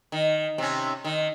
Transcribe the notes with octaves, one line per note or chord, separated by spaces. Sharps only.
D#3
C3 C#4
D#3